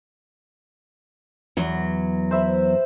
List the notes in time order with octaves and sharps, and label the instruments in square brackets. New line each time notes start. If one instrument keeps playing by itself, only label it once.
[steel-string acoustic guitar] E2 F#3
[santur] C5 E5 B5